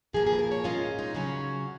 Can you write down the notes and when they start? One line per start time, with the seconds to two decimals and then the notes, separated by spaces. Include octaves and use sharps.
0.13 A#2 F3 A#3 G#4
0.26 G#4
0.33 B4
0.39 A#4
0.51 C#5
0.64 A#2 G#3 C#4 F4
0.99 D#4
1.14 C#3 F#3 C#4 F#4